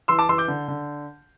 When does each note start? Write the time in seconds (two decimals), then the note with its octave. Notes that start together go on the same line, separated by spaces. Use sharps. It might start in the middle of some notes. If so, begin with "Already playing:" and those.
0.08 E3 C6 E6
0.19 A5 D6
0.29 E3 C6 E6
0.38 D6 G6
0.48 D3
0.68 D3